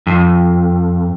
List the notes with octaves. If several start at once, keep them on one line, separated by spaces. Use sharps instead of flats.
F2